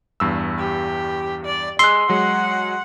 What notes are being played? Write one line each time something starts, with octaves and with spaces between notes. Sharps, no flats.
E2 G2 E6
G4
D5
G#3 C6 E6 F#6
F#3 G#3 F#5